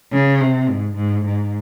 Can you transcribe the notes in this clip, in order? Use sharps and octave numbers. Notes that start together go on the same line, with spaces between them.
C#3
C3
G#2
G#2
G#2